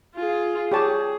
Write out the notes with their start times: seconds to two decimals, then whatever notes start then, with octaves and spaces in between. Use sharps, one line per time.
0.15 F4 G#4
0.72 G4 G#4 C#5 A5